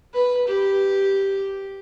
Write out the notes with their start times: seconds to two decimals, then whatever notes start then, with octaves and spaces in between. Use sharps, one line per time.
0.14 B4
0.47 G4